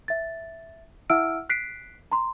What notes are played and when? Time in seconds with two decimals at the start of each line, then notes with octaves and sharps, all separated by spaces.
0.08 E5 A6
1.10 E4 E5 F#5 E6 F6 D7
1.49 F#6 B6 C7 D7
2.12 A#5 C6